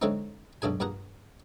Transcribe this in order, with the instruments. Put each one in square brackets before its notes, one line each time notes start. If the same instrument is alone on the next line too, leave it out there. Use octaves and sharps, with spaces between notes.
[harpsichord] D3 G#3 A3 C4 C#4 D#4
B1 F#2 D4 G#4 G#5
G2 A#2 G#4 F#5 A#5